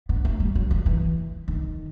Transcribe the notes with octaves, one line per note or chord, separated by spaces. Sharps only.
B3
A3
G3
F#3
F3
E3
D#3